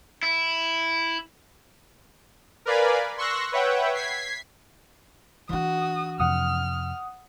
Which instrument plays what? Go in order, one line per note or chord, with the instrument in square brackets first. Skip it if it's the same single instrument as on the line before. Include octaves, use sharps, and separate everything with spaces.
[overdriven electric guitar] E4
[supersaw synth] A#4 B4 D5 F5 G#5 B5
C6 C#6 E6 F#6 A#6
B4 C#5 E5 F#5 G5
G#6 B6 C7
[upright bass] E3 D4 [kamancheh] F#4 D#6
[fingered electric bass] F2 C3 [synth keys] F#5 D#6 [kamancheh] F6